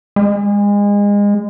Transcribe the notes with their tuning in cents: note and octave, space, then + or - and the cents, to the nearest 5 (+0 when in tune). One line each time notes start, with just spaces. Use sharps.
G#3 -30